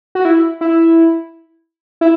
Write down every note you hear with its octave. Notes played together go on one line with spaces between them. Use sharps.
F#4
E4
E4
E4